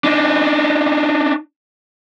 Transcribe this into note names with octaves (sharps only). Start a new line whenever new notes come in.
D4 D#4